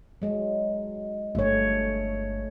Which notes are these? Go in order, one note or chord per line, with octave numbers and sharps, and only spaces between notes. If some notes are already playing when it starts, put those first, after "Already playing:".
F#3 G#3
G1 A3 C#5